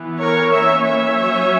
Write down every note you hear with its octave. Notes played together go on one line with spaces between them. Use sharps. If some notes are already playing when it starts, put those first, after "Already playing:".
Already playing: E3 B3
A#4 C#5
E3 A#3 C#4 C#5 E5
C#5 E5
F#3 C#4